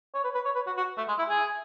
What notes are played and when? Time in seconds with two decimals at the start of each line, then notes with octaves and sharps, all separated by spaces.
0.14 C#5
0.24 B4
0.34 B4
0.45 C#5
0.55 B4
0.66 F#4
0.77 F#4
0.97 A3
1.08 G#3
1.18 E4
1.29 G#4